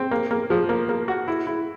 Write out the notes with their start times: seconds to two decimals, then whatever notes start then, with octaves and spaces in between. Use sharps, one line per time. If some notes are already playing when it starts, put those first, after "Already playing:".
Already playing: C4
0.11 A#3
0.31 A#3
0.50 F3
0.69 A#3
0.89 A#3
1.08 F#4
1.28 E4
1.47 E4